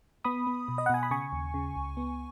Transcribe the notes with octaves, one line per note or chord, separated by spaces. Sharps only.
B3 B5 D#6
B3
B2
D#5
F#5
B2 G#5
B5
C#3 G#5 C#6
D#2
C#3
C#2
B3